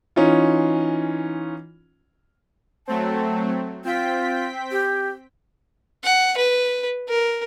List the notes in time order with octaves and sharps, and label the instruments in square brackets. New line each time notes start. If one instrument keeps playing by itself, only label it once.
[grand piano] E3 C#4 D#4 F4
[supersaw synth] F#3 A3 C4 [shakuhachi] A5
[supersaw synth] C4 G5 B6 [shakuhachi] F4
[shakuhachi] G4
[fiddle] F#5
B4
A#4